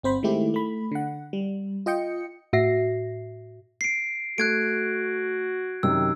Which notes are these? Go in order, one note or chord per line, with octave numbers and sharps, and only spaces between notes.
G1 C4 C5 B5
D#3 G#3 A3 E4 G4
A3 B5
D3 F#5
G3
F4 D#5 G5 C#7
A2 F#4 E5 A#6 C7
C7 D7
A3 F#4 F#6 G#6 D7
F#2 C3 D#3 E6